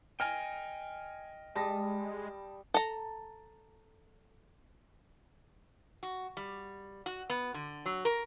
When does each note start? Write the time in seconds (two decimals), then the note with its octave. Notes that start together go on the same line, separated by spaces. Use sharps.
0.20 D#5 G5 G#5 F6
1.56 G3 G#3 A5 D#6 A#6
2.74 A4 A#5
6.03 F#4
6.37 G3
7.06 F#4
7.30 B3
7.54 D3
7.86 F#3
8.05 A#4